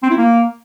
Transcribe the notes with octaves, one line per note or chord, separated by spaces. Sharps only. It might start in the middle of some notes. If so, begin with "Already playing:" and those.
C4
E4
A#3